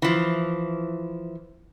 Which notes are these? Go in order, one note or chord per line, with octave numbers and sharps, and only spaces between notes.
E3 F3